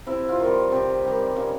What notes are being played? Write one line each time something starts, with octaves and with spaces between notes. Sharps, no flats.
C3 E4
F4
D#3 G3
C3 G4
D#3 G3
C#3